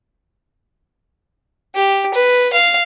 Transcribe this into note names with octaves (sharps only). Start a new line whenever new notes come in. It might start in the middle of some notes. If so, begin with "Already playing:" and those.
G4
B4
F5